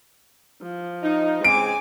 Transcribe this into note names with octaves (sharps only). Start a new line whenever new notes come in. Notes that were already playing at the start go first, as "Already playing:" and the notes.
F3
D#4
C#3 G#3 C4 G#5 D6 D7